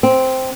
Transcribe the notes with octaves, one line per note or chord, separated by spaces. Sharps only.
C4